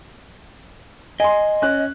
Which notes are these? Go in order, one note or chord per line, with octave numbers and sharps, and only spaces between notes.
D#5 G#5 C6
C#4 F#6